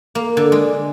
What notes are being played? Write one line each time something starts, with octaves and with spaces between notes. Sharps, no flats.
A#3
D3
G#3